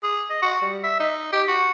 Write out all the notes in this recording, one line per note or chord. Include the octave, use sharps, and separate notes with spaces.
G#4
D#5
F#4
G3
E5
D#4
G4
F#4